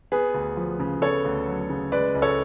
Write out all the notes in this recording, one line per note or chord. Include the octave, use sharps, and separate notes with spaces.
B3 G#4 B4
D2
F3
C#3
B3 A4 C#5
D2
F#3
C#3
G#3 B4 D5
C#2
A4 C#5